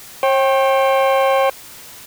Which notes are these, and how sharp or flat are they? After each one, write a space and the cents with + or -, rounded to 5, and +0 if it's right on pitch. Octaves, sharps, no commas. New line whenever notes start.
C#5 -45 G5 +0